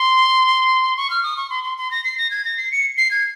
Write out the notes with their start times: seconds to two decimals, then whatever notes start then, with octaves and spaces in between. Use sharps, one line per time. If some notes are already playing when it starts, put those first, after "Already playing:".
Already playing: C6
0.97 C#6
1.10 F6
1.23 D#6
1.37 C#6
1.50 C6
1.64 C6
1.77 C6
1.91 A#6
2.04 C7
2.18 A#6
2.31 G#6
2.45 A#6
2.57 C7
2.71 C#7
2.98 C7
3.11 G#6